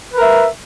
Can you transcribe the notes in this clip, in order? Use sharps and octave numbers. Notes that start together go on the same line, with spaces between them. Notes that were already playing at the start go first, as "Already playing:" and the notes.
A#4 B4 E5